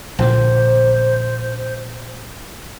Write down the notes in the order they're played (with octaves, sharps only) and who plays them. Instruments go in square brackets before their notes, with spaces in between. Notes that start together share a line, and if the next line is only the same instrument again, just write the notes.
[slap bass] A#1 A#2 D3 [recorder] C5